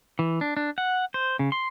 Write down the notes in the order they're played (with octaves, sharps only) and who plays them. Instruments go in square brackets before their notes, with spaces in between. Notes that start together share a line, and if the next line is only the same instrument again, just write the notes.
[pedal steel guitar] E3
D4
D4
F#5
C5
C#3
C6